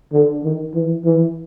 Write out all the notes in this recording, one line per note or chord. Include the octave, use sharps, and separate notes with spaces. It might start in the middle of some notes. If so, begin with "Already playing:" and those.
D3
D#3
E3
E3